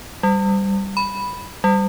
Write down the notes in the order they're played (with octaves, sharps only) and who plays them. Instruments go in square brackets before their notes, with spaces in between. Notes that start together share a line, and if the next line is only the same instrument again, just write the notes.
[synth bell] G3
B5
G3